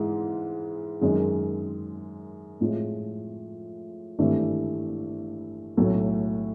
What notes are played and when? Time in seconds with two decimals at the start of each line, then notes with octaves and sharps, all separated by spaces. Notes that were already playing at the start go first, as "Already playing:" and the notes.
Already playing: G#2 E3 G#3
1.01 F#2 D#3 G#3
2.61 A2 F3 G#3
4.19 G#1 G2 E3 A3
5.77 B1 A2 F#3 A3